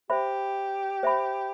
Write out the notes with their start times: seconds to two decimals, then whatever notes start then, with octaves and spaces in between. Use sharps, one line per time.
0.10 G4 C5 E5 B5
1.03 C5 E5 B5